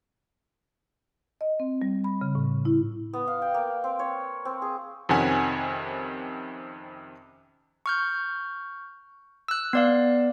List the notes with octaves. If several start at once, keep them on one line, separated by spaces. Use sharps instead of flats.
D#5
C4
G3
B5
C#3
A2
E4
B3
F5
G5
A#3
C4
C#5
C4
G#4
F2 C3 D#3 C#4 F#5 G#5
C#6 F6 G6
E6 F#6
B3 D5 F5